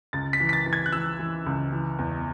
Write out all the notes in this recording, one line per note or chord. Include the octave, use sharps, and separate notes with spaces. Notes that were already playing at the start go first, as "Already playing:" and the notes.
C#2 A6
B6
E3
B6
A6
E3
G#6
F#6
E3 E6
E3
C#2
E3
E2